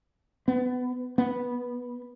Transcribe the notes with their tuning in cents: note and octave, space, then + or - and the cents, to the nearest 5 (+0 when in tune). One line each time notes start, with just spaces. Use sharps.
B3 +20
B3 -10